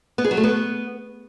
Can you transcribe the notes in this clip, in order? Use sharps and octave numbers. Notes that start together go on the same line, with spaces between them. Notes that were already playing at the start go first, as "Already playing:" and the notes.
B3
G#4
F#3
A3
B3